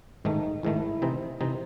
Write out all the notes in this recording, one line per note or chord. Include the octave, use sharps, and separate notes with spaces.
A1 G#2 D#3 A3 D#4
A1 G#2 D#3 A3 E4
C3 E3 C4 D#4
C3 E3 C4 D#4